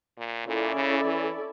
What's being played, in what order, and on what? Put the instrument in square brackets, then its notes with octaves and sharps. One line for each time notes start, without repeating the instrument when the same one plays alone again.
[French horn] A#2
[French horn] A#2 [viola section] C#4 E4 A4 D5
[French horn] C#3
E3